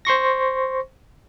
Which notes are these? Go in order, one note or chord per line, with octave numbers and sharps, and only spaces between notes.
C5 C6 C#6 A#6